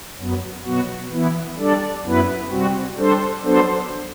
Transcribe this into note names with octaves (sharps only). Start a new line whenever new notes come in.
F#2 F#3 B3
B2 F#3 B3 F#4
E3 B3 E4
G3 D4 A4 D5
F#2 F#3 B3 E4 B4
C3 G3 C4 F#4
G3 D4 A4 C5
F#3 B3 D4 A4 C5